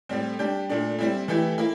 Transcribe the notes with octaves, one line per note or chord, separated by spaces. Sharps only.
A2 G3 C4
G3 D4 G4
A#2 A3 D4
G3 C4 E4
E3 A3 E4 G4
A#3 E4